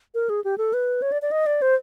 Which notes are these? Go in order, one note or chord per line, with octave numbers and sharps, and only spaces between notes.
A#4
G#4
G4
A4
B4
C#5
D5
D5
D#5
D5
C5